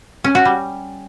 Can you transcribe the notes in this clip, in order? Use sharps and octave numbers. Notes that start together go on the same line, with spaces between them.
C#4
F#4
G3